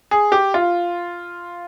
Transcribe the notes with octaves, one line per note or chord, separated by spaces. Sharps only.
G#4
G4
F4